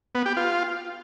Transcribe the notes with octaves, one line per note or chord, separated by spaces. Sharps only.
B3
G4
F4